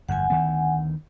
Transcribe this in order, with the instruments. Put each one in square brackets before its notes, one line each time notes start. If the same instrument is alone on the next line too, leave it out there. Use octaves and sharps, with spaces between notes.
[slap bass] G1 F2 [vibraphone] F#5 G#5
[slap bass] D2 D#3 B3